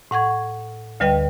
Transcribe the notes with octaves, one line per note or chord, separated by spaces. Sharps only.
A2 F#5 C#6 G#6
D2 D3 G3 B4 D#5 G5